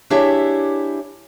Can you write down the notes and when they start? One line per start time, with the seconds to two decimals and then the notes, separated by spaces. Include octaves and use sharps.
0.10 D4 E4 G4 G#4 C#5 E5